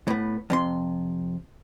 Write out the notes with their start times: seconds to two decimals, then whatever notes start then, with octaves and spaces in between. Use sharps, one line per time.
0.08 A2 B3
0.50 F2 C3 C6